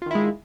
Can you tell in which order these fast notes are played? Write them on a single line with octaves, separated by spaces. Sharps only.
F4 D#3 E4 G#3